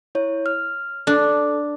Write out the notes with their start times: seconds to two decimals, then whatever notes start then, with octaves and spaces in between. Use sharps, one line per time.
0.15 E4 C#5
0.46 F6
1.07 D4 A4